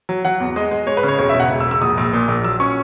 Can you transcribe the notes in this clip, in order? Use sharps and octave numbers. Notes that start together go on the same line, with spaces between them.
F#3
F#3 F#5
E2
G#3 D#5
G#3
G#3 C#5
B4
C#3
C#5
E1 C#5
E5
E1
F#5
E1
E6
E1
E6
A#1 D#6
A#1
A#2
A#1
F#3 E6
C#4 C#6